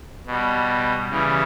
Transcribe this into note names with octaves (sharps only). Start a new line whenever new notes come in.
B2 G3
C#3 E3 G3